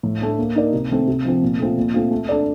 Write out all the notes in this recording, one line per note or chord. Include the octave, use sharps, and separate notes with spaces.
A2
A3 D4
A#3
D#4 A#4 D5
C3
D#3 A3 C4
C3
F3 C4
A#2
A3 C4 F4
A#2
A3 C4 F4
A3
D4 A4 D5